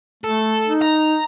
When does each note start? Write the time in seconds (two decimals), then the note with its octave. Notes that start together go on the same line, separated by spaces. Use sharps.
0.24 A3 A4
0.67 D#4
0.82 A#5